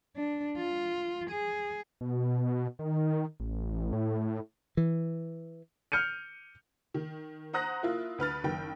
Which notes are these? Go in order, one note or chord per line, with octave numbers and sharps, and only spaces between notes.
D4
F4
G#4
B2
B2
D#3
A1
A2
E3
F6 G6 C#7 D#7
D#3
C5 F#5 A#5 D#6 F#6 A#6
A#3 E4 F4
D2 B4 F6 A6
F#1 D#3 G5